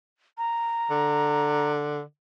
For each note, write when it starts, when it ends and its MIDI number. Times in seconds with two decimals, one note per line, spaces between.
0.38 1.71 82
0.90 2.01 50